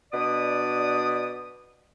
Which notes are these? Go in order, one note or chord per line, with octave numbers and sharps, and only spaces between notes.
B2 D4 D5 D#6